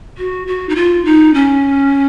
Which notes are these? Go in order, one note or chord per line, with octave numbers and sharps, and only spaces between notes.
F#4
F#4
D#4
F4
D#4
C#4